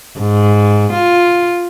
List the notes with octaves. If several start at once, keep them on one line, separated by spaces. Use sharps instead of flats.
G#2
F4